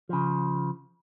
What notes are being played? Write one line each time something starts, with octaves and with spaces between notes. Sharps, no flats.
C#3 F3